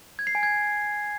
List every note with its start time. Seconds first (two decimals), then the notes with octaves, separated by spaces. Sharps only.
0.19 G#6
0.27 C7
0.35 G#5
0.43 G#6